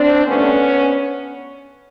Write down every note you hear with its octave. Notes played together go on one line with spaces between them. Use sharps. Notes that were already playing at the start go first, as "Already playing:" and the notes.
Already playing: C4 D4
G2 D3 F3 A3 B3 C#4